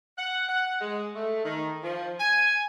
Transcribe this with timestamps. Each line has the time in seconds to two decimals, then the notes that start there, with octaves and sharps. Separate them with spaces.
0.18 F#5
0.48 F#5
0.81 G#3
1.15 A3
1.44 D#3
1.83 F3
2.19 G#5